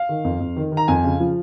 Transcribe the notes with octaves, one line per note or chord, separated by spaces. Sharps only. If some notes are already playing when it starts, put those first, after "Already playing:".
Already playing: F5
D#3
F2
F2
D#3
D#3
A#5
F2 G#5
C#3
F3